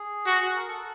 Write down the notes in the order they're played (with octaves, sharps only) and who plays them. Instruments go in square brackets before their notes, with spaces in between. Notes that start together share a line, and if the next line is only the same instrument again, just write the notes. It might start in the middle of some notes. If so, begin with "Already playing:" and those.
Already playing: [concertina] G#4
[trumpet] F#4
[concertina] A#4
A4